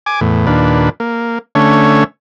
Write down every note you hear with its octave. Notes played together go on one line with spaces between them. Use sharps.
G#5 D6
E2 A2
D#2 A#2 D4 B4
A#3
D3 A3 C#4 C#5